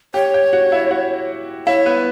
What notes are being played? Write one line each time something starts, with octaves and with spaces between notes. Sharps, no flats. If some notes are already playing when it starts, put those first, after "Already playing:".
G4 C#5 G5
G4 G5
F#4 F#5
E4 E5
F#4 F#5
E4 C#5 E5
B3 B4